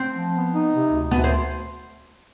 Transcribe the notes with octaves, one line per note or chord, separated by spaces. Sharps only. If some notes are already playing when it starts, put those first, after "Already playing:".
Already playing: C4
F3
B3
D#4
C3
D2
D2 B3
C4